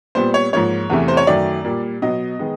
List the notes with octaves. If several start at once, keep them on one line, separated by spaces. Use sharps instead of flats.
A#2 G3 B3 C5
C#5
G#2 F3 A#3 C#5
E2 C3 E3 A3
C5
C#5
F#2 D#3 F#3 A3 D5
A#2 G3 A#3
B2 F#3 B3 D#5
D#3 G#3 B3